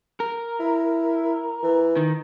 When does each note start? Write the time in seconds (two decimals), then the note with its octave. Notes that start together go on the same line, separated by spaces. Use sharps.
0.20 A#4
0.60 E4
1.63 E3
1.97 D#3